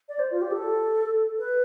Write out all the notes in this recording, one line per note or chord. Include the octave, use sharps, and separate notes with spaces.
D5
C5
F4
G4
A4
B4